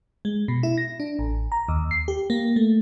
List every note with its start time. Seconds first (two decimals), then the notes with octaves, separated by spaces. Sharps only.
0.25 G#3
0.48 B2
0.63 E4
0.78 A#6
1.00 D4
1.19 A1
1.52 A#5
1.68 D#2
1.91 C7
2.08 G4
2.30 A#3
2.56 A3